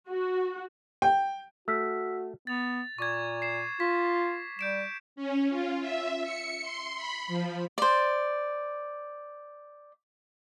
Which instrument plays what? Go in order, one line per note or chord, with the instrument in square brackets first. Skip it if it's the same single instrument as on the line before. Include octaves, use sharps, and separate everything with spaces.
[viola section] F#4
[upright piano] G5
[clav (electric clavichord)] A3 [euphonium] F#4 [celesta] E6 F6 B6
[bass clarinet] B3 [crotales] A6 F7
[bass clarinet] A#2 [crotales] C#6 D6 G#6
[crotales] C7 E7
[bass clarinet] F4 [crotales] B6
[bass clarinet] G3 [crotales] G6 D7 E7
[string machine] C#4
F4
E5
C#7
C6
B5
F3
[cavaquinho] C5 D5